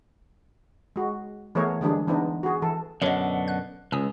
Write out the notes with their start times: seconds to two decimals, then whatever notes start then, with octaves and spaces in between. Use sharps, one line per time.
0.96 G#3 F#4
1.55 E3 A3 B3 G#4 A#4 C#5
1.81 D3 E3 G3 G#3 D4 G#4
2.07 E3 B3 C4 D4 D#4
2.43 F#4 G#4
2.62 E3 A4
3.02 F#2 B2 D3 C#5 D#5
3.48 F#6
3.92 C#2 G#5 D#6 E6